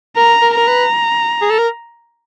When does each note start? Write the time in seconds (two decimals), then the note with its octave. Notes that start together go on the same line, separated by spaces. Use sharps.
0.17 A#4 A#5
0.42 A#4
0.55 A#4 A#5
0.68 B4
1.42 G#4
1.50 A4
1.59 A#4